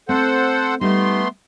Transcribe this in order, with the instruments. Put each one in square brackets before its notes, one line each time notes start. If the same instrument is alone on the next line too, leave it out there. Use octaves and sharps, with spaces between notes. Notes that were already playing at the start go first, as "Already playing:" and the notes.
[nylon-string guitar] A3 C4 [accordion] A4 C5 F#5
[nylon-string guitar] G3 D#4 [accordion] A3 B3 C6